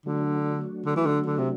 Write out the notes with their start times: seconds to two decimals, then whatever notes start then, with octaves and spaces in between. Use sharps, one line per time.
0.06 D3 F#3 A3 D4 F#4
0.86 D3
0.96 E3
1.06 D3
1.26 D3
1.38 C3